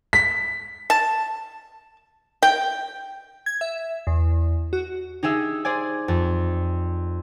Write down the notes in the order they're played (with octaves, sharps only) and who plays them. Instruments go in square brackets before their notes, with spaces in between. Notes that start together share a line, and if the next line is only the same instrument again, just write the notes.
[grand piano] B6
[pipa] A5
G5
[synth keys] G#6
E5
E2
F#4
[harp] D#4 G4 G#4 E5
G#4 C5 D5 G#5
F2